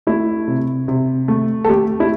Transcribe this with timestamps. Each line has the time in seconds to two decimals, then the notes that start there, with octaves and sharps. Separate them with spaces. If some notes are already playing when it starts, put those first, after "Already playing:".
0.07 A3 E4
0.47 C3
0.88 C3
1.28 A3
1.65 A4
1.69 A3 G4
2.00 E4